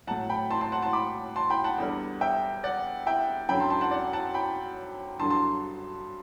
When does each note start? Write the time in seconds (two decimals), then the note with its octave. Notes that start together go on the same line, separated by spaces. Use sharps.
0.07 A2 F#3 F#5 A5
0.30 G5 B5
0.50 A5 C6
0.61 A5 C6
0.72 F#5 A5
0.82 A5 C6
0.93 B5 D6
1.36 A5 C6
1.50 G5 B5
1.64 F#5 A5
1.78 E2 D3 G3
2.21 E5 G5
2.64 D5 F#5
3.06 E5 G5
3.49 F#2 D3 F#3 G5 B5
3.60 A5 C6
3.70 A5 C6
3.81 F#5 A5
3.91 D5 F#5
4.13 F#5 A5
4.34 G5 B5
5.19 G2 D3 F#3 A5 C6
5.30 A5 C6